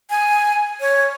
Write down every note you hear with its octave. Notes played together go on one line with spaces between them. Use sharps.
G#5
C#5